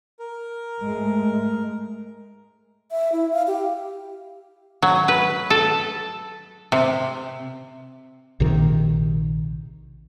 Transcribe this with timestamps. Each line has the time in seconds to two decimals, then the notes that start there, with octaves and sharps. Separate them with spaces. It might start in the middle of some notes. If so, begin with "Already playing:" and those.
0.20 A#4
0.81 G#2 G#3 A3
2.91 E5
3.12 E4
3.33 F5
3.47 G4
4.82 F#3
5.08 B4
5.50 A4
6.72 C3
8.40 A#1 C3 D#3